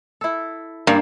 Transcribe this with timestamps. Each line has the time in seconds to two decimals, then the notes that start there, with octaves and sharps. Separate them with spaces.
0.21 E4 A4
0.87 G2 A#3 D4